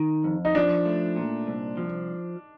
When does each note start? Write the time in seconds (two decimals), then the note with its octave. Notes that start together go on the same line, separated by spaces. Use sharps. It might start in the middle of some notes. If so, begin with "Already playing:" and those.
Already playing: D#3
0.24 F2
0.45 D#4
0.55 F3 D4
0.86 A3
1.16 A#2
1.47 C2
1.77 F3